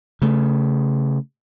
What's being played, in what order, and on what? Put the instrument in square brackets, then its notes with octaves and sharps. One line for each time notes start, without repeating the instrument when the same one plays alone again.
[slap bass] C#3 A3